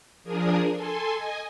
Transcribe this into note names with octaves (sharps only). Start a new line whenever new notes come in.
F3 D4 G#4 A#4 D#6
A4 G#5 C6
D#5 G#5